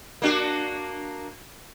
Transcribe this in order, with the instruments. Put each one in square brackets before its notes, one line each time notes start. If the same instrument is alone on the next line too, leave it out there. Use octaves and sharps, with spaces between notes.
[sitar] A#3 D4 F#4